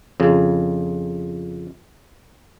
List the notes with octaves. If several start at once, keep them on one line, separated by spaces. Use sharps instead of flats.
F2 C#3